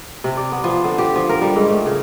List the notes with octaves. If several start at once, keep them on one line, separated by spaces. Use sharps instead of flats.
C3
D5
B3
F3
D3
G4
F3
A#4
G3
G#2
A3
C#3